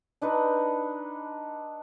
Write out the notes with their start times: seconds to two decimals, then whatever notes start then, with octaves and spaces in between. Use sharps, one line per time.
0.22 D4 D#4 B4